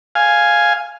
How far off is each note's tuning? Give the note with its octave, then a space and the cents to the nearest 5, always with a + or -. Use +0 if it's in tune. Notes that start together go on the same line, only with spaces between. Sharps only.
F5 +0 G#5 +0